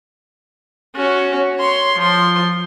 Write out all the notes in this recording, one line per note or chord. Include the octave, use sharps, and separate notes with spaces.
C#4 F#4
C#5 C6
F3 C6